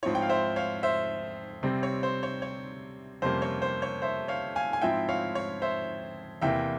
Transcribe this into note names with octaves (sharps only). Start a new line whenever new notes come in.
G#2 F3 C4 E4 C#5
G5
F5
C5 E5
C#5 F5
C5 E5
C3 G3 C4
C#5
C5
C#5
C#5
F2 C3 G3 A#3 C#4 C5
C#5
C5
C#5
C5 E5
C#5 F5
F5 G#5
G#5
G#2 F3 C4 E4 E5 G5
C#5 F5
C#5
C5 E5
E2 C3 E3 A#3 E5 G5